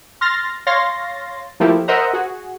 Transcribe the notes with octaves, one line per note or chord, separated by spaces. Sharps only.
C6 F6 A6 A#6
C#5 F5 C6 A6 A#6
F3 A3 A#3 E4 G4
A#4 C5 D#5 E5 F#5 A#5
F#4 G#4